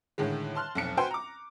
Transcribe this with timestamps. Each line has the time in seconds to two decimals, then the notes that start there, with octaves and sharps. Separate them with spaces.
0.18 A2 D3 D#3 G#3
0.55 A5 C6 F6 F#6
0.75 F1 B1 C#7
0.97 F#4 B4 C5 G5 G#5 C6
1.11 A#5 D6